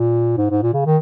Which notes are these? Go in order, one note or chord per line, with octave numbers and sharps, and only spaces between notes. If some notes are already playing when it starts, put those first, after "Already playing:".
Already playing: A#2
G#2
G#2
A#2
C#3
D#3